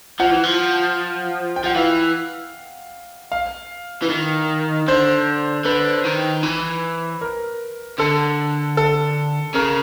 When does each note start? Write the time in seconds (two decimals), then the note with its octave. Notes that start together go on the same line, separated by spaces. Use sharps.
0.20 F3 F#5
0.31 E3
0.44 F3
1.56 G5
1.64 F3 F#5
1.75 E3 F5
3.32 F5
4.02 E3
4.09 D#3
4.88 D3 C5
5.65 D3 B4
6.05 D#3
6.43 E3
7.21 A#4
7.99 D3 A4
8.77 A4
9.55 C#3 A#4